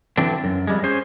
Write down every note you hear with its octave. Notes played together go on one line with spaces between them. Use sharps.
D3 E3 F#3 C4 D4
F#2
F2 G3 G#3
C#4 G#4 C5